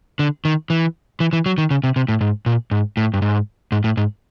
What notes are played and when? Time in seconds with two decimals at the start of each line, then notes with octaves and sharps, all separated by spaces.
0.19 D3
0.45 D#3
0.70 E3
1.20 E3
1.33 E3
1.46 F#3
1.58 D#3
1.71 C#3
1.84 C3
1.96 C3
2.08 A2
2.21 G#2
2.46 A#2
2.71 G#2
2.97 A2
3.14 G2
3.22 G#2
3.72 G#2
3.84 A2
3.97 G#2